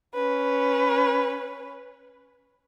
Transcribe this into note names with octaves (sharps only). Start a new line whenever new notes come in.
C#4 B4